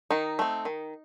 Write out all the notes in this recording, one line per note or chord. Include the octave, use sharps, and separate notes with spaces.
D#3 D#4
A3 C4
D#3